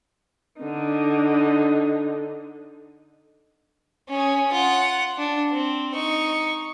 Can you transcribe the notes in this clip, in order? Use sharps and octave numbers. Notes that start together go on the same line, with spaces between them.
D3 D#4
C#4 G#4
F4 F#5
D4
C4
D#4 C#6